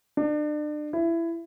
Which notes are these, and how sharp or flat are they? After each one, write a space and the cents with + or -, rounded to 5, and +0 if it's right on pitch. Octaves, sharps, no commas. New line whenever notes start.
D4 +35
E4 +20